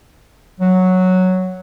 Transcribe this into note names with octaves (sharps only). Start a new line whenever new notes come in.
F#3